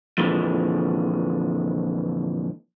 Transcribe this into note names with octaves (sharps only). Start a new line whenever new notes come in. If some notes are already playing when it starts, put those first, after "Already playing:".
F2 A#2 D3 E3 G#3